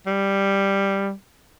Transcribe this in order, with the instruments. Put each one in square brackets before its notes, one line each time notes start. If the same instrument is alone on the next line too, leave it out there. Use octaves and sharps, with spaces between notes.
[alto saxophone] G3